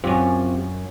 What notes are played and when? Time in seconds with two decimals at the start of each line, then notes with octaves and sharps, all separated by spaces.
0.04 F#2 C4 C#4 F4 G4